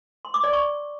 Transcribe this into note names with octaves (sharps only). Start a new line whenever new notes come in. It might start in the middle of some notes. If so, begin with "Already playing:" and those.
C6
D6
D5
C#6